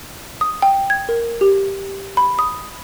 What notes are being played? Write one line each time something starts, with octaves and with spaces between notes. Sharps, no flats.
D#6
G5
G#6
A#4
G4
B5
D#6